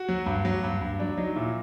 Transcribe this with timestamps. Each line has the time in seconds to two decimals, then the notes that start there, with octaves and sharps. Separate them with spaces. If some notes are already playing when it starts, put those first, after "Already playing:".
Already playing: F#4
0.09 F#3
0.26 G2
0.45 F#3
0.63 G2
0.81 G2
0.99 F#3 D4
1.17 F#3 D#4
1.36 A#2 E4